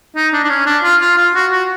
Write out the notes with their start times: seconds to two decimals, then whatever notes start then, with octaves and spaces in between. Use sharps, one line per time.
0.16 D#4
0.33 D4
0.44 D4
0.50 C#4
0.66 D4
0.83 F4
1.01 F4
1.18 F4
1.35 F#4
1.52 F#4